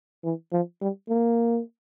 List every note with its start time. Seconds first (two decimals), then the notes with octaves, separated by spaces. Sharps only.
0.24 E3
0.52 F3
0.81 G3
1.09 A#3